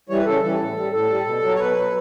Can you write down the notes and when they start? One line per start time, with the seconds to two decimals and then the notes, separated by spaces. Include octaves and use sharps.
0.09 E3 G3 C#5
0.17 B4
0.26 C#3 A4
0.42 E3 G3 A4
0.60 A2
0.76 G3
0.92 A2 A4
1.10 G3
1.25 B2
1.42 F#3
1.55 C#5
1.59 B2 B4
1.75 F#3